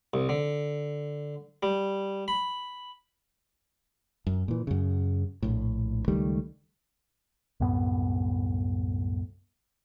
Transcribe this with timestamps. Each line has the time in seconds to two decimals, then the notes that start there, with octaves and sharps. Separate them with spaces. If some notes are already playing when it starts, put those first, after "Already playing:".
0.14 C2
0.29 D3
1.63 G3
2.28 B5
4.27 F#2
4.48 A#2 E3
4.67 F#2 C#3
5.42 A#1 A2
6.08 C#2 D#3 G3 A3
7.60 C2 F#2 A2 B3